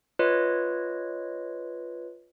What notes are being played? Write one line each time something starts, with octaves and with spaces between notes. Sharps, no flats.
F4 B4 C#5 D#5